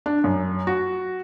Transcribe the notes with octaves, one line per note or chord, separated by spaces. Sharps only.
D4
F#2
F#4